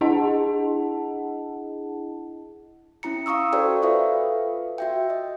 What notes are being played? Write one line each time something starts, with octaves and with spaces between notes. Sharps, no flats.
D4 E4 G#4 D#5 F#5 A5
C#4 E4 A#5 C#7
F5 A#5 C#6 D#6 E6
F#4 A4 C5 D5 G5
F4 A4 B4 E5 F5
F#4 E5 G5
D#5